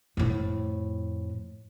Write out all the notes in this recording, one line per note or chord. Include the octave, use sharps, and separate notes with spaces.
F2 A2